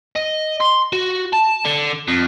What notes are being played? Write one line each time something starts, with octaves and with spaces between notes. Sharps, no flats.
D#5
C6
F#4
A5
D3
F2